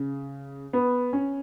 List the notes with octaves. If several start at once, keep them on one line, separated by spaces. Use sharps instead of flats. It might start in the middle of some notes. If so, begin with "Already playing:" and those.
Already playing: C#3
B3
C#4